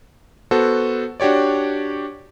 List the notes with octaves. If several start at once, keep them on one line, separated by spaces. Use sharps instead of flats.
B3 F#4 A4 C5
D4 F#4 G4 C#5 D5